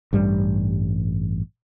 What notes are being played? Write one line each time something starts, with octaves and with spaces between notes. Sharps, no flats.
A1 G2 G3